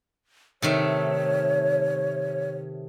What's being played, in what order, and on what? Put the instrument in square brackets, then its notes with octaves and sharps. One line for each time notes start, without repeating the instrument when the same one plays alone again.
[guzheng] C3 D#3 A3 [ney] C#5